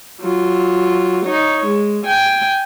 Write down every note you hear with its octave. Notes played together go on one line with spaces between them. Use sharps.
F#3 F4
D#4 C#5
G#3
G5 G#5